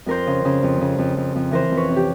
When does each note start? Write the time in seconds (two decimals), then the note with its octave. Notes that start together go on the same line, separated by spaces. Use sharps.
0.06 F2 A#4 C5
0.27 C#3
0.45 C#3
0.63 F2
0.81 C#3
0.98 F2
1.17 F2
1.35 F2
1.51 E3 A#4 C5
1.71 F2
1.77 B4 C#5
1.89 C3
1.96 G4